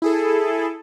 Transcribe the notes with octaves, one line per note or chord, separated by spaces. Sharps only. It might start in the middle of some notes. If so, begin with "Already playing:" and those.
E4 G#4 A4